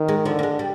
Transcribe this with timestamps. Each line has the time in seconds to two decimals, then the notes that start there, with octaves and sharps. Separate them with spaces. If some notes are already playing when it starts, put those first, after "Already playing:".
Already playing: D#3
0.09 G#3
0.25 D3 F3
0.39 A#3
0.43 G#3
0.59 G3